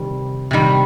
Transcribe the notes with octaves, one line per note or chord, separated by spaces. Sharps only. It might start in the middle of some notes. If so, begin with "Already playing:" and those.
Already playing: C3 D#3 G3
C3 D#3 G3